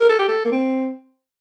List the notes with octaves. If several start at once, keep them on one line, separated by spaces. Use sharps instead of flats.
A#4
A4
G4
A4
A#3
C4